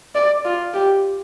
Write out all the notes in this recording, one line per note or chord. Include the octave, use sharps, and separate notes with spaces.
D5
F4
G4